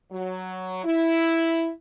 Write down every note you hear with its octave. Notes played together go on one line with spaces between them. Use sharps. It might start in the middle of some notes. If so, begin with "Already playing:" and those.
F#3
E4